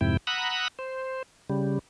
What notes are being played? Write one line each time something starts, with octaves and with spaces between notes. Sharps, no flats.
F2 G#2 C3 E4 G5
F#5 A#5 B5 D#6 E6 F#6
C5
C#3 G3